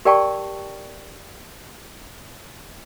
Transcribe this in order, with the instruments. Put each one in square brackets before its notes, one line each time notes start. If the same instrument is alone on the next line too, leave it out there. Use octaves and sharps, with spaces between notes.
[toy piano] G4 A#4 D5 G5 A5 C#6